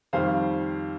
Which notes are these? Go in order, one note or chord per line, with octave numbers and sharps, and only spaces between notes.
F2 D#3 G3 C5 F5